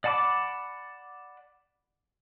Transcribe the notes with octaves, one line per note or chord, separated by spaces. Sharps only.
D5 F#5 A5 B5 D6